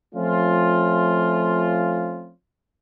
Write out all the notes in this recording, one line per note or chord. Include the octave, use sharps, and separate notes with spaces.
F3 A3 C4 C#4 F4